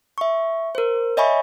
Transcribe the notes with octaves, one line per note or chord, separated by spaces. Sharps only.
E5 C#6
A#4 C5
C#5 D#5 E5 G#5 B5 C#6